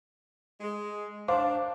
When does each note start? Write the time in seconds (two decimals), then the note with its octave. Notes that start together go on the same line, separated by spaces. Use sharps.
0.60 G#3
1.28 D4 C5 F5 D6